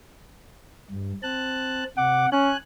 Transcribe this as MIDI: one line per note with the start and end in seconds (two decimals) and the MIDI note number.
0.91 1.13 43
1.23 1.84 60
1.23 1.84 81
1.23 1.84 90
1.97 2.26 48
1.97 2.28 78
1.97 2.26 86
2.32 2.54 61
2.32 2.57 80
2.32 2.57 90